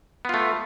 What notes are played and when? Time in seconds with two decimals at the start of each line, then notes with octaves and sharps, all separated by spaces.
0.25 B3
0.29 F4
0.34 A3